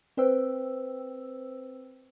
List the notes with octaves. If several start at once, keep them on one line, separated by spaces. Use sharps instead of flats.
C4 B4 C5 G5 E6